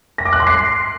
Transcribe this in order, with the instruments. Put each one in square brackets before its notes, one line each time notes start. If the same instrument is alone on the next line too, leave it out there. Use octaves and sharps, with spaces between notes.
[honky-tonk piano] A#6
D6
F#6
C6
C7